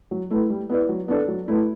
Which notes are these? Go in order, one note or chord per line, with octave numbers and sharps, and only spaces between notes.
F#3
A3 E4 B4
G3
B3 E4 B4 D5
F#3
B3 D4 A4 D5
F#3
A3 E4 B4